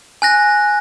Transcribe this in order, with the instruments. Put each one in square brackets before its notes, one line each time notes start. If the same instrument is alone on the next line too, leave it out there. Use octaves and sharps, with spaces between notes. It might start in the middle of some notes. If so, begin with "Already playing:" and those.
[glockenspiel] G#5 F#6 A#6